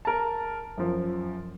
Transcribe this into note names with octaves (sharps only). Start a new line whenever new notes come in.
A#4 A5
F#2 F3